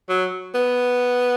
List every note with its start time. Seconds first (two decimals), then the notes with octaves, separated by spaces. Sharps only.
0.09 F#3
0.55 B3